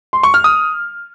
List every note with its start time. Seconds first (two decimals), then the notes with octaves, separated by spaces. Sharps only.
0.13 C6
0.23 C#6
0.34 F6
0.44 D#6